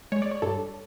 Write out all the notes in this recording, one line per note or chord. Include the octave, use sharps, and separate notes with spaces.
G#3 C#5
D5
C#5
G2 A4